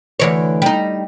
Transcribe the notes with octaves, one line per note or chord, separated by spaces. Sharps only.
D2 E3 C#5
G3 D#4